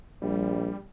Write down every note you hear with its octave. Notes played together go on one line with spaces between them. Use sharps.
A#1 G3